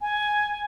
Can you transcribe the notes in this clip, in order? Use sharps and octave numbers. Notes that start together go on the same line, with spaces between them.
G#5